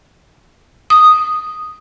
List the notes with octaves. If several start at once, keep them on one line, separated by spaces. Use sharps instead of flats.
D#6